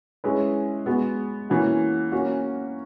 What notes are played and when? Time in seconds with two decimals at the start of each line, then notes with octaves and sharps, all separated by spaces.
0.24 G#3 C#4 E4 G#4 B4
0.86 G#3 B3 F#4
1.50 E3 A#3 C#4 F#4
2.12 A#3 C#4 F#4